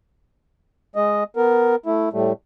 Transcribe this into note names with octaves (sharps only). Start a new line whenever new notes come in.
G#3 D#5
B3 A#4
A3 E4
A2 G3 A3